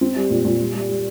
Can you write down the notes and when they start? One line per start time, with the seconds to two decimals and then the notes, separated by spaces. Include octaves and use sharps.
0.01 C4
0.16 G3
0.30 A#2
0.45 A#2
0.60 G3
0.74 G3
0.89 G3